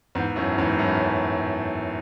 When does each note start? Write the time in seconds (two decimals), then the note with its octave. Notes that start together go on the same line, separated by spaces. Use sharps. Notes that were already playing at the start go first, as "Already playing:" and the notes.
0.15 E2 G#2
0.36 F#2 A2
0.58 E2 G#2
0.79 F#2 A2
1.00 F#2